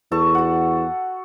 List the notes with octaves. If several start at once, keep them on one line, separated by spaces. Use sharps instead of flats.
E2 A4 A5 C#6
F#4 F#5